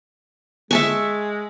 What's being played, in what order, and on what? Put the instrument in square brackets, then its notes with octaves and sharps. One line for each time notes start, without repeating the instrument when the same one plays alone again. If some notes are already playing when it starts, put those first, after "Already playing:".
[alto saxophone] G#3 [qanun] E5 A5 C#6